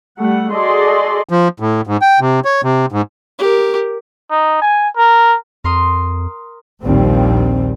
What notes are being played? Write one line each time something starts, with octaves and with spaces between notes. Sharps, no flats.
G3 A3 F#5
F#4 G#4 A4 D5 D#5 C6
F3
A2
G#2
G5
C3
C#5
C3
G#2
G4 A#4
D#4
G#5
A#4
F2 A#4 C6 D#6
A#1 D#2 A#2 G3 C4